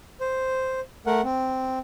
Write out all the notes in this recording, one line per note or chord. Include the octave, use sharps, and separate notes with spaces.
C5
A3 A#4 F#5
C4